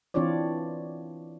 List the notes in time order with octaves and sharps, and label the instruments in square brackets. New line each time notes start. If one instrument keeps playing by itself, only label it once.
[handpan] E3 C4 D4 F4 C#5 D5